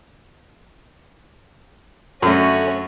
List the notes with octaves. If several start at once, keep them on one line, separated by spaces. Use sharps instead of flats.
F#2 D3 A3 C#4 F#4